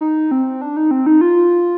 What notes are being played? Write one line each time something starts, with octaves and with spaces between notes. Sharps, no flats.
D#4
C4
D4
D#4
C4
D#4
F4